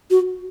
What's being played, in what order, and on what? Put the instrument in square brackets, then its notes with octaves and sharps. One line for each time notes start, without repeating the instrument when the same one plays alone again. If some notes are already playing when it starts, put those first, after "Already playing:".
[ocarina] F#4